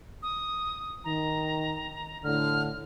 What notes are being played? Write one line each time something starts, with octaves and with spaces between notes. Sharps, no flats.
D#6
D#3 A#5
A2 D3 F6